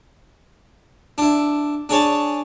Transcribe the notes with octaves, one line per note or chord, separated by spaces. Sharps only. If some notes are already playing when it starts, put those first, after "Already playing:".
D4 E4
D4 G#4 C#5 A5